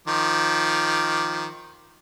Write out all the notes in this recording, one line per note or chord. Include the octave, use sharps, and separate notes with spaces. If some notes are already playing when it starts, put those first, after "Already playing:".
D#3 F3 D6